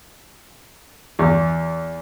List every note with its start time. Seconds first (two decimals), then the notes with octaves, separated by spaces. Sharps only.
1.19 E2